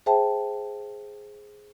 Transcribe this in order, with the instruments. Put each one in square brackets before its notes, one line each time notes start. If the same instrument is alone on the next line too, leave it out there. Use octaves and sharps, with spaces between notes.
[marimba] G#4 C5 E5 G5 A5